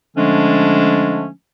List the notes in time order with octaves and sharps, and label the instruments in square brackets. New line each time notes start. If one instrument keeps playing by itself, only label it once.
[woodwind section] D3 F3 G#3 A3 C#4 D4